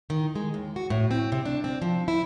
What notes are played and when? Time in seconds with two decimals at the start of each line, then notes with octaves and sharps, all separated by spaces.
0.10 D#3
0.35 G#3
0.54 D#2
0.76 F#4
0.90 A2
1.11 C4
1.32 C3
1.45 D4
1.64 C4
1.82 F3
2.08 E4